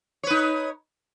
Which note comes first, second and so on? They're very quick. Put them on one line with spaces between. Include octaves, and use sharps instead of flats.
C#5 B4 D#4